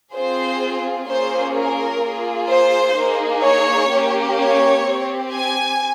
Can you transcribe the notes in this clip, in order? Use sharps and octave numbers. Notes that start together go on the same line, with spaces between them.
C4 F4 G#4 C5
A#3 C#4 F4 G#4 C5
A#4
A#3 F4 G#4
C5
A#3 D#4 G#4
C#5
A#3 C#4 G4
C#5
C4 G4
G#5